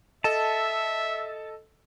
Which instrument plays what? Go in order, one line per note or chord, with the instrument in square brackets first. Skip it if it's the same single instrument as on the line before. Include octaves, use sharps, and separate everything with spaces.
[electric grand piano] A4 D#5 [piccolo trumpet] E5 [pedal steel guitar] A5